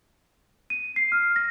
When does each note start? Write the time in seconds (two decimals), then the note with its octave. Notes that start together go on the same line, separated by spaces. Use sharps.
0.70 D#7
0.96 C7
1.12 F6
1.36 A#6